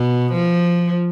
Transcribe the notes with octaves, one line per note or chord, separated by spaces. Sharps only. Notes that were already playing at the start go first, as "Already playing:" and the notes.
Already playing: B2
F3